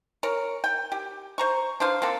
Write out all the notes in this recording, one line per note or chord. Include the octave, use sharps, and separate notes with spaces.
A#4 C#5
G5
G4
C5 A#5 C#6
D4 B4 C5 F5
A#3 C4 D4 A4